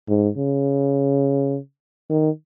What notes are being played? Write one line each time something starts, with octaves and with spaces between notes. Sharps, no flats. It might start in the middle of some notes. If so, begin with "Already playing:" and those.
G#2
C#3
D#3